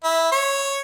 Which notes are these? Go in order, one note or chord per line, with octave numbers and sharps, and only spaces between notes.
E4
C#5